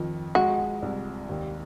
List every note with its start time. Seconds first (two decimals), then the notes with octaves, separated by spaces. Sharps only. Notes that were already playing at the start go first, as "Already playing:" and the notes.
Already playing: F2 D#3
0.35 G#3 F#4
0.82 C2
1.29 D#2